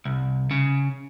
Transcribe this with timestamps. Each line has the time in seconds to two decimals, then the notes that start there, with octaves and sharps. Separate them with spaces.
0.05 C2
0.51 C#3